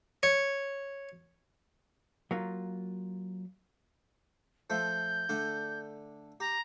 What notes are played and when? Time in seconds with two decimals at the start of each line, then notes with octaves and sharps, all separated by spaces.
0.23 C#5
2.31 F#3 A#3 F4
4.70 F3 A3 E5 G6
5.29 D3 A3 D4
6.40 G4 A#5